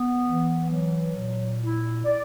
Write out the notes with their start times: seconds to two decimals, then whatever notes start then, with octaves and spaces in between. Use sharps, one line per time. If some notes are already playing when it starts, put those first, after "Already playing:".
Already playing: B3
0.25 E3
0.70 F#3
1.15 A#2
1.60 E4
2.04 D5